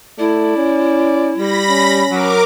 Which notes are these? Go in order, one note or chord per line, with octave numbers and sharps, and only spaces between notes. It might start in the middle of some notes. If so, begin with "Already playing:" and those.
A3 E4 D5
C#4
G3 B5 A#6
C#4
F#3 A#4 D6